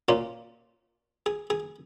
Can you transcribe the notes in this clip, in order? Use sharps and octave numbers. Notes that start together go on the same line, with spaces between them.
A#2 A#3 C#4 F4
G#4
G#4